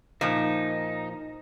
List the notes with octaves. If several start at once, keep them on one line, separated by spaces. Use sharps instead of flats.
A#2 F3 D#4